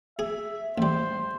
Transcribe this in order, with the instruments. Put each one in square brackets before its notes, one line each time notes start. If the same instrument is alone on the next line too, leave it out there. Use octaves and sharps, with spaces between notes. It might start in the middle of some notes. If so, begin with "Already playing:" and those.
[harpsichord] G#4 [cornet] E5
[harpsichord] A1 G3 [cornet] C5